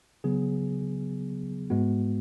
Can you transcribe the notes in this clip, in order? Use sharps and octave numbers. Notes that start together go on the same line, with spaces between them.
C#3 F#3 B3 G#4
G#2 G#3 B3 F#4